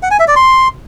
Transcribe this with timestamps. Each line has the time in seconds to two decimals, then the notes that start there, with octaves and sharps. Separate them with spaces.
0.03 F#5
0.11 G#5
0.19 E5
0.28 D5
0.36 C6